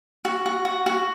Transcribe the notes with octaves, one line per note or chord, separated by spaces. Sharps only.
F#4
F#4
F#4
F#4